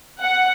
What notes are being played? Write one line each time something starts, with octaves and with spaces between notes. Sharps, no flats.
F#5